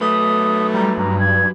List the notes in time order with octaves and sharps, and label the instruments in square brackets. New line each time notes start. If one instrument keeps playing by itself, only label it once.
[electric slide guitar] F#3 B4 [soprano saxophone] A3 [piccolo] D#6
[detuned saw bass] G3 [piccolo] A#5
[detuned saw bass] G2 [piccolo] A#5
[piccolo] G#6